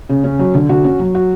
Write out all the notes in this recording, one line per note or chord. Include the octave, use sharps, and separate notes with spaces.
C#3
C#4
F#3
D3
D3 F#4
C#4
F#3
F#4